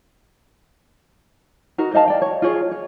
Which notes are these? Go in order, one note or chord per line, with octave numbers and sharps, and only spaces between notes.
D#4 F#4 A#4
C5 D#5 F5 A5
D5 G5
C#5
F4 F#4 G#4 C#5
C#5